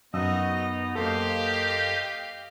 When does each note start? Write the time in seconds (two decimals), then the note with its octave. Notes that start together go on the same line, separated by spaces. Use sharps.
0.14 F#2 B3 D#4 F#4 D#5 E6
0.95 F#2 A#3 G4 A4 C5 D#5 F5